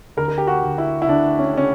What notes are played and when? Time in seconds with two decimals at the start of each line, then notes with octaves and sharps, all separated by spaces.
0.17 D2 A#4
0.28 A#4
0.38 G4
0.47 F#4
0.63 D2
0.78 E4
1.02 E4
1.08 D2 D4
1.39 C#4
1.53 C#3 C#4